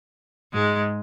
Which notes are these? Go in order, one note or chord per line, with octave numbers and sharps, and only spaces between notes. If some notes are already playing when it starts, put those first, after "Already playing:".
G#2 G#3